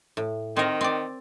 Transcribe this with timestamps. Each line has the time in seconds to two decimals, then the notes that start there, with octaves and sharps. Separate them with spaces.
0.17 A2
0.57 D#3 C4 A#4
0.81 C4 D5